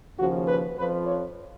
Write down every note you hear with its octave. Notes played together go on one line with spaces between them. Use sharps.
D#2 C#3 F3 F#4
B4
F2 F3 B4
C#5